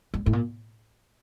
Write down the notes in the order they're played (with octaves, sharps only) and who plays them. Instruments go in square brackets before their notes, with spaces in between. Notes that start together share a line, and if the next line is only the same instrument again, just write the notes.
[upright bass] G3
A2
A#2